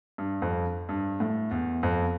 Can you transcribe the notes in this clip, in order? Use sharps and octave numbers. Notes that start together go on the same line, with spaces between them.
G2
F2
G2
A2
E2
F2